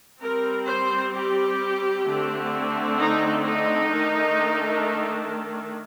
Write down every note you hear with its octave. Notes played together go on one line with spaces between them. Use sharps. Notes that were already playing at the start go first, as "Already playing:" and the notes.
G3 C4 A#4
C5
G4
D3 A3 C4
D#4
D#4
D#3 A3 D4